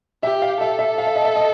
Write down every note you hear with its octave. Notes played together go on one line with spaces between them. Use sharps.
G4 E5
F5
A4 E5
E5
F5
E5
D#5
E5
D#5